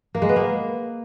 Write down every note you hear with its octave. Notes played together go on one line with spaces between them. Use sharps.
A#3
G#3
B3
A#3